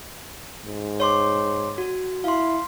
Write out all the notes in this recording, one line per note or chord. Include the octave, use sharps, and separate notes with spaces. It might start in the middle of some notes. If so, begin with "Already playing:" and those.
G#2
C#5 C6 D6
F#4
E4 F5 C6